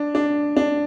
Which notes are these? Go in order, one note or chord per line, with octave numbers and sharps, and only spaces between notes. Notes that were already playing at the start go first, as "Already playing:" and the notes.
Already playing: D4
D4
D4